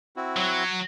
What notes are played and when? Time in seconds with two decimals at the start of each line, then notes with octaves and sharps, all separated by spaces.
0.16 C4 E4 F#4
0.37 F#3